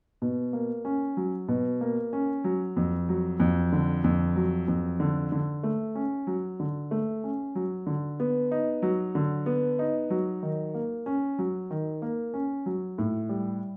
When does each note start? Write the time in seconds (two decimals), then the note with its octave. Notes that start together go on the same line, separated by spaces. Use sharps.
0.22 B2
0.53 A#3
0.85 C#4
1.17 F#3
1.48 B2
1.81 A#3
2.13 C#4
2.44 F#3
2.77 F2
3.09 F#3
3.40 F2
3.72 D3
4.04 F2
4.36 F#3
4.68 F2
5.00 D3
5.32 D3
5.63 A3
5.95 C#4
6.27 F#3
6.60 D3
6.91 A3
7.24 C#4
7.55 F#3
7.87 D3
8.20 B3
8.51 D#4
8.82 F#3
9.15 D3
9.46 B3
9.79 D#4
10.10 F#3
10.43 D#3
10.74 A#3
11.06 C#4
11.38 F#3
11.71 D#3
12.02 A#3
12.34 C#4
12.66 F#3
12.98 A2
13.29 G3